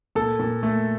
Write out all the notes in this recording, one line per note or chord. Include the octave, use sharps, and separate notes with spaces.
A#2 A4
A#2
A3